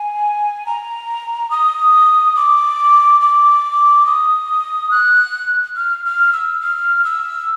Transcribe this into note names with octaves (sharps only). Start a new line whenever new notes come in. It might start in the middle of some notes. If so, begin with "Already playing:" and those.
Already playing: G#5
A#5
D#6
D6
D6
D#6
F#6
F6
F6
E6
F6
E6